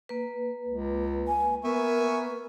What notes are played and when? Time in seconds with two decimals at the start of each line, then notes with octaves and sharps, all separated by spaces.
0.09 A#3 B4
0.68 C#2
1.28 G#5
1.64 B3 A#4 E5 G#5 C#6